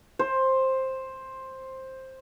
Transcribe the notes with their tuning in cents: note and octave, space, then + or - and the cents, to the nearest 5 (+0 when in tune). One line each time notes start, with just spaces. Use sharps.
C5 +10